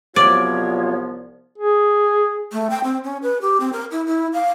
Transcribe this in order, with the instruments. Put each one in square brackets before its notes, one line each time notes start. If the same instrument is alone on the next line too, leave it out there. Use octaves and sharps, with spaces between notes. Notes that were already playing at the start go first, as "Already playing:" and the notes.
[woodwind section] C2 F3 B3 [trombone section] F#3 C4 F4 [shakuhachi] C#5 [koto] D5
[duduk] G#4
[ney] A3
G5
C4
C#4
B4
G4
C4
A#4
E4
E4
F5